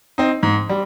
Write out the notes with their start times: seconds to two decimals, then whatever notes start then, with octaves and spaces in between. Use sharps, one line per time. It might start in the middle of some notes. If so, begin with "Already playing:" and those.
0.18 C4 D#4
0.43 G#2
0.69 G3